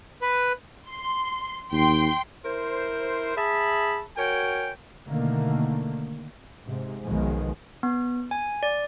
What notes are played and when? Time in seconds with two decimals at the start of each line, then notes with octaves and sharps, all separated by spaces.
0.22 B4
0.87 C6
1.72 D#2 G5 C6
2.44 E4 A#4 C5
3.36 G#4 E5 A5 B5
4.17 F#4 A#4 C#5 G5 G#5
5.08 B2 D3 D#3 A3 A#3
6.64 G#2 C3
7.04 B1 B2 D#3 F3 G#3
7.83 B3
8.31 G#5
8.63 D5